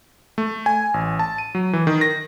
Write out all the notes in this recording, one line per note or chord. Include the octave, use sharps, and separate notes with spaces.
A3
G#5
A1
A5
D#7
F#3
E3
D#3
A#6